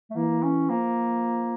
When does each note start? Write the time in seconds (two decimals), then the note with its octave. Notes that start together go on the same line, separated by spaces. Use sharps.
0.11 A3
0.16 E3 A#3
0.43 C#4
0.69 F3 A#3